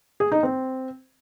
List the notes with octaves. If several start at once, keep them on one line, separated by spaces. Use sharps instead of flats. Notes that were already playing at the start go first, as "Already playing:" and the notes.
G#4
D#4
C4